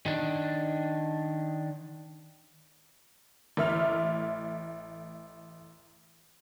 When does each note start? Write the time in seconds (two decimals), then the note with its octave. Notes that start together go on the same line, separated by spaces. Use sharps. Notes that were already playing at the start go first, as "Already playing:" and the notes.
0.06 D#3 D4
3.57 A1 A3 E5 F6 F7